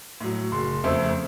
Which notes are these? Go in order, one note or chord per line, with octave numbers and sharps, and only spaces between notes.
A2 F#3
F#1 C6
F2 C#3 A3 C4